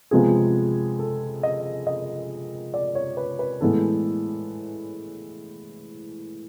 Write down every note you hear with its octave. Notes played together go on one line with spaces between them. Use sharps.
C3 F3 G#3 B3 G#4
A4
D#5
D#5
D5
C#5
B4
B4
A2 E3 G#3 B3 A4